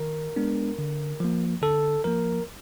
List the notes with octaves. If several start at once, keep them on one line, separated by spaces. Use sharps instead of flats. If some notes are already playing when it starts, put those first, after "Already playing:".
Already playing: D#3 A#4
G#3 B3 D4
D3
F3 A#3
D3 A4
F3 A#3 A#4